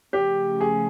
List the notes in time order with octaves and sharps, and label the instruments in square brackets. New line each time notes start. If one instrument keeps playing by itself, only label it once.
[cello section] C#3 F3 A3 C#4 [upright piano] G4
[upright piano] G#4